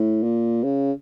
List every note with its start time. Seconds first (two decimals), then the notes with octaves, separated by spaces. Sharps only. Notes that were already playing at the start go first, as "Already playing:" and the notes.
Already playing: A2
0.23 A#2
0.64 C#3